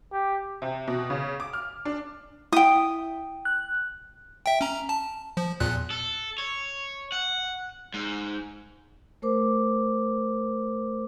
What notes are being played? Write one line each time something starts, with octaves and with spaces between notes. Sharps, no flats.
G4
C3
B2
C#3
D6
F6
D4
E4 G5 D#6
F#6
E5 G5
C#4 A#5
A5
F3
E2 A#2 F#6
A4
C#5
F#5
G#2
A3 A#4 C5 D6